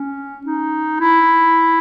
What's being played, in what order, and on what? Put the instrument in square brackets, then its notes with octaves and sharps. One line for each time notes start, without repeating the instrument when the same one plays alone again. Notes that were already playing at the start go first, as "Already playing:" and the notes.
Already playing: [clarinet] C#4
D#4
E4